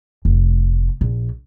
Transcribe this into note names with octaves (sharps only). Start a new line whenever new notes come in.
F1
A#1